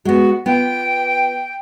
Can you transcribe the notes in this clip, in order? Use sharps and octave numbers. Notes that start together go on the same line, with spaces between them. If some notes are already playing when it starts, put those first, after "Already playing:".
G#3 B3 F#4
B3 F4 G5